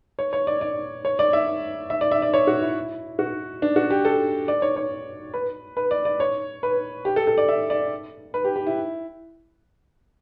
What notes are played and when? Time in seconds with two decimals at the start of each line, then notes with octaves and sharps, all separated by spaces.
0.19 C#5
0.33 C#5
0.47 D5
0.61 D5
1.05 C#5
1.19 D5
1.33 E5
1.90 E5
2.01 D5
2.11 E5
2.22 D5
2.34 C#5
2.47 F#4
2.62 E4
3.19 F#4
3.62 D4
3.76 F#4
3.90 G4
4.05 A4
4.48 D5
4.62 C#5
4.76 C#5
5.34 B4
5.77 B4
5.91 D5
6.05 D5
6.20 C#5
6.63 B4
7.05 G4
7.16 A4
7.27 A4
7.38 D5
7.48 E5
7.70 D5
8.34 B4
8.45 G4
8.56 G4
8.67 E4